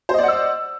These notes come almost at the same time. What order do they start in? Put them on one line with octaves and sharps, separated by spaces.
C5 D#5 D5 F#5 E6